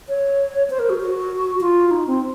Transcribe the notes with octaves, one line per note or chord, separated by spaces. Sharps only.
C#5
C5
A#4
F#4
F#4
F4
D#4
C4